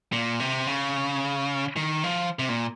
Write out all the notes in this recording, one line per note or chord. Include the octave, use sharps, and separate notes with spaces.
A#2
C3
C#3
D#3
F3
C3
A#2